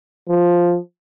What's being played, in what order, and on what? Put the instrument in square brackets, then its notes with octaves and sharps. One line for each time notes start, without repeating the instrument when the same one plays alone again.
[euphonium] F3